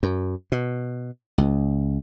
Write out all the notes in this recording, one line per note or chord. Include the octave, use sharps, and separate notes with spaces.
F#2
B2
C#2